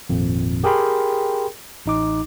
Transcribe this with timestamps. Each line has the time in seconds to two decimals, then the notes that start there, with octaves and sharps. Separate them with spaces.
0.09 G#1 F2 A#2
0.64 G4 G#4 A#4 G5 B5 C6
1.86 A1 D#4 D6